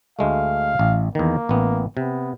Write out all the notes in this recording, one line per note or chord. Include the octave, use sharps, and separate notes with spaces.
D2 G#3 A3 F5
A1
E2 D#3 A#3
A1 B3
C3 B3